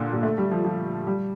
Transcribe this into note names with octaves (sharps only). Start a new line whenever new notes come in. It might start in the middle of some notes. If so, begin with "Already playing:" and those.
Already playing: A#2 D3
A#2
A3
G3
F3
F3
G3